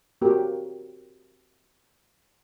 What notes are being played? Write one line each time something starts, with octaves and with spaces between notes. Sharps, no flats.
A#3 C4 F#4 G4 A#4